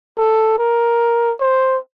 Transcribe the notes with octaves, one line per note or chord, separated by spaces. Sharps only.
A4
A#4
C5